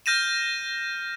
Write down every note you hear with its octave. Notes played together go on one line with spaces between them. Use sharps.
F6 G6 A#6 D#7 E7